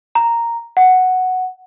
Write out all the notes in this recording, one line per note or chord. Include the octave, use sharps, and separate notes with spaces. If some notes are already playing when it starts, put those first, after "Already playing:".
A#5
F#5